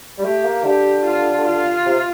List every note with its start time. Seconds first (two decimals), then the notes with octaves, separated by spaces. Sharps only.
0.18 G3
0.24 A3 G4
0.45 A#3
0.64 D3 G4
1.05 F4
1.45 F4
1.86 C3